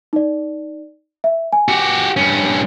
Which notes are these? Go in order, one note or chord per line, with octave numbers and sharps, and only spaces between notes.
D#4 D5
E5
G#5
F#4 G4
G2 C#4